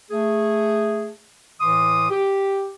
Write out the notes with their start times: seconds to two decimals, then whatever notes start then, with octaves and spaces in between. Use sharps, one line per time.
0.11 A3 G#4
1.61 A2 E3 C6 D6 D#6
2.10 G4